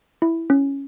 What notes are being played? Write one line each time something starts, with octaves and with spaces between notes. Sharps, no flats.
E4
C#4